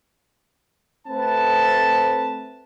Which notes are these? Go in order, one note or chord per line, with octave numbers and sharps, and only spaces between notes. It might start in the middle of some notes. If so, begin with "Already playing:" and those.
A3 C4 B4 A5